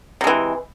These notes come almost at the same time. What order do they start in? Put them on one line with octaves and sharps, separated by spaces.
C3 G#3 E3